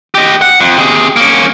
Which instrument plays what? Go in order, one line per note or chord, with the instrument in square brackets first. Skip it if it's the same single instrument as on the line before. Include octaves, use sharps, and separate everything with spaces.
[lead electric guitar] G4 D#5
F#5
F2
C3 G#4
A#3 C#4